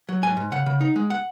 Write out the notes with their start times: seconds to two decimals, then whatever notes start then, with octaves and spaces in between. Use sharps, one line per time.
0.09 F#3
0.23 G#2 G#5
0.37 G#2
0.52 C#3 F#5
0.66 C#3
0.81 D#4
0.96 G#3
1.10 F#5